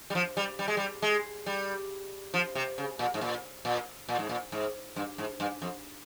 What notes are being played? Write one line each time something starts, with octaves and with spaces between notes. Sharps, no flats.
G3
F3
G3
G3
G#3
G3
G#3
G3
F3
C3
C#3
A#2
G#2
A#2
A#2
A#2
G#2
A#2
G#2
G2
G#2
G2
F2